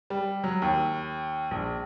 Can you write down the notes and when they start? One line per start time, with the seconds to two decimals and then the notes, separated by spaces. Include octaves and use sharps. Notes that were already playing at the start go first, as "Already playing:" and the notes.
0.10 G3
0.44 F#3
0.62 D#2
1.51 A#1